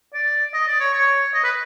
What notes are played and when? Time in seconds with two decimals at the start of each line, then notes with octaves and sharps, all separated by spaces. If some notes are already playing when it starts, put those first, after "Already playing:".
0.14 D5
0.54 D#5
0.68 D5
0.80 C#5
0.93 C#5
1.34 D#5
1.44 B4